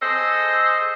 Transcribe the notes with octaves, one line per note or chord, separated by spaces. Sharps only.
G#4 A4 C5 D#5